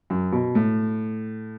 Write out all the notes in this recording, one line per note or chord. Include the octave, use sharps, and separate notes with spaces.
F#2
B2
A2